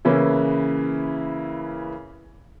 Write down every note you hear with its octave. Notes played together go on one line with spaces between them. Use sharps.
C#3 E3 A#3 C#4 E4 B4